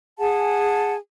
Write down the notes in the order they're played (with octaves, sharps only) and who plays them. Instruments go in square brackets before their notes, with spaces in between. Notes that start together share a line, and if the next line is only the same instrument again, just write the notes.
[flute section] G#4 F#5 G#5 A5